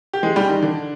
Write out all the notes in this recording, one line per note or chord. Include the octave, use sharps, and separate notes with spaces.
G4
G#3 G#4
G3 G4
D#3 D#4
D3 D4